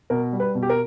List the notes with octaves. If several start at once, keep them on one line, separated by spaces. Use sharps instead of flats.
B2 A#4
G3
B4
B2
G4
A#4